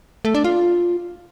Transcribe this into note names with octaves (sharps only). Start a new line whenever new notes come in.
A3
D4
F4